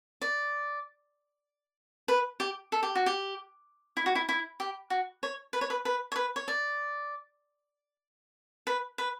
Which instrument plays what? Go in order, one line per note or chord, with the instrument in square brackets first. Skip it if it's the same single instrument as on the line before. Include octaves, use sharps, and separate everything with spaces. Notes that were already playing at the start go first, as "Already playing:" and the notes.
[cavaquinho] D5
B4
G4
A4
G4
F#4
G4
E4
F#4
E4
E4
G4
F#4
C#5
B4
C#5
B4
B4
C#5
B4
C#5
D5
B4
B4